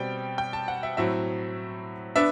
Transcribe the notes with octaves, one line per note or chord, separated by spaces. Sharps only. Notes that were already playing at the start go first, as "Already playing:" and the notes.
Already playing: B2 G3 C4 G5
G5
A5
F#5
E5
A2 F#3 C4 E5
B3 D4 E5